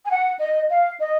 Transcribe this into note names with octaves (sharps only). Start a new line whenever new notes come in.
G#5
F#5
D#5
F5
D#5